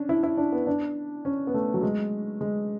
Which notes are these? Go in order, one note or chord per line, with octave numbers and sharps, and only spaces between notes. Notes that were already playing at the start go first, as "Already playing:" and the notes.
Already playing: C#4 D4
E4
E4
D4
B3
D4
C#4
B3
A3
F#3
G#3
G#3